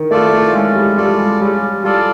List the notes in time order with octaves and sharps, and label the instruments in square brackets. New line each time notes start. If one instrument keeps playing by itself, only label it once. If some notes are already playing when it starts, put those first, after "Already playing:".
Already playing: [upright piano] D#3
[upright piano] A3 [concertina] F4 A4 D5
[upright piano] A3
[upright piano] G#3 [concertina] C#4
[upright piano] G3
[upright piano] G3 [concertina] F4 A4 D5
[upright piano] G#3
[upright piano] G3 [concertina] C#4
[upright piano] G3 [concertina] F4 A4 D5